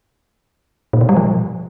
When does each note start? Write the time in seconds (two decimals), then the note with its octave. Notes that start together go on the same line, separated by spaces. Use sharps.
0.93 A#2
1.01 B2
1.09 G3
1.17 F3